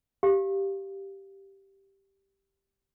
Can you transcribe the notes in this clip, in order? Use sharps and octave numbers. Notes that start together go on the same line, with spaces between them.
G4 F5